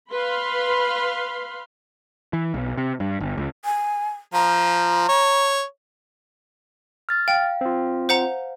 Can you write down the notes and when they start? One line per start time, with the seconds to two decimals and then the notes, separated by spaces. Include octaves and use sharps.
0.13 B4 F5 B5 C6
2.33 E3
2.54 B1
2.77 C3
3.00 G2
3.20 G1
3.37 C#2
3.65 G#5
4.34 F3 A#5
5.09 C#5
7.09 F6 A6
7.28 F5 G5
7.61 C4 F4
8.09 C5 F#5 A#5